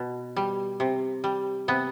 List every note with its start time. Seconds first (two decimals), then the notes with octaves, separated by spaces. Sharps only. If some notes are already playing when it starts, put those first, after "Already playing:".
Already playing: B2
0.36 G3
0.80 C3
1.24 G3
1.68 C3 B3